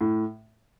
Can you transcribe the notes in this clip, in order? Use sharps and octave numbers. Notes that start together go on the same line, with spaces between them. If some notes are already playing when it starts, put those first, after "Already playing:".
A2